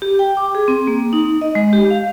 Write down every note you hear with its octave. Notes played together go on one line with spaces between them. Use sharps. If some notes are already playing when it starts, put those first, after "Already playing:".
G4
G5
D6
G#4
C4
A#3
D#4
D#5
G#3
G4
F5